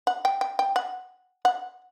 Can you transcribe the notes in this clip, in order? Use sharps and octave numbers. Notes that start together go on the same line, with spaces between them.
F#5
G5
G5
G5
F#5
F#5